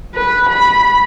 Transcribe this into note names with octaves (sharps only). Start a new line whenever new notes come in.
B4
B5